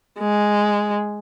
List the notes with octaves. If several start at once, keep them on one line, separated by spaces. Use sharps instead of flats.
G#3